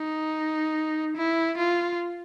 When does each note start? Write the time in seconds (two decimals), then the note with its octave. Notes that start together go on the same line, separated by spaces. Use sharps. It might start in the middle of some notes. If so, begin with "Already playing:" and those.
Already playing: D#4
1.17 E4
1.58 F4